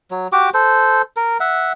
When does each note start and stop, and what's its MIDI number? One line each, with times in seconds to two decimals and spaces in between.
0.11 0.28 54
0.32 0.50 66
0.32 0.50 67
0.32 0.50 86
0.54 1.02 69
0.54 1.02 72
1.16 1.38 70
1.40 1.73 76
1.40 1.73 78